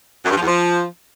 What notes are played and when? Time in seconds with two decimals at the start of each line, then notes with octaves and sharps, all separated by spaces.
0.25 F#2
0.30 G2
0.36 F3
0.41 E2
0.47 F3